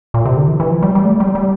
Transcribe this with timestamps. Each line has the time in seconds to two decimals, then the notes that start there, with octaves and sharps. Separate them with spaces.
0.14 A#2
0.25 C3
0.37 D3
0.48 E3
0.60 E3
0.71 F3
0.82 G3
0.95 G3
1.05 A3
1.20 G3
1.35 G3